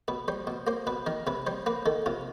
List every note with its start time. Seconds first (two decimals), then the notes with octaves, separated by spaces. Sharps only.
0.08 B2 B4
0.28 G3 C5
0.47 B2
0.67 A#3 C5
0.87 B2 B4
1.06 D#3 A#4
1.27 C3 B4
1.47 G3 C5
1.66 A#3 B4
1.86 D#3 A4
2.06 C3 F4